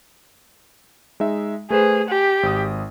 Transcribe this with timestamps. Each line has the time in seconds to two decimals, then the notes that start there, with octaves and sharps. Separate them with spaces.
1.20 G#3 D#4 E5
1.70 A3 G#4 B4 C5
2.09 G4 G#5
2.43 G#1 D#6